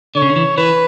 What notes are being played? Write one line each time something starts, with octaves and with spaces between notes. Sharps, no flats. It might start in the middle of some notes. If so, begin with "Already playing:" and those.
D3 C#5
C#3
D3
E3
E3 B4